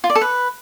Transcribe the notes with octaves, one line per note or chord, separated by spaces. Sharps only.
F4
D5
A4
B4